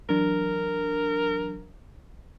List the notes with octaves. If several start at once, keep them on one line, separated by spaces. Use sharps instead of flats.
E3 F#3 D4 A#4